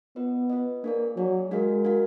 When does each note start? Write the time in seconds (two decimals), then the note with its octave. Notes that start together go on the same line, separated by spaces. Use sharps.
0.16 B3 F4 B4 D#5
0.50 F4 B4 D#5
0.84 A#3 D4 G#4 D5
1.17 F#3 D4 G#4 D5
1.51 G#3 D4 F#4 A#4 F5
1.85 D4 F#4 A#4 F5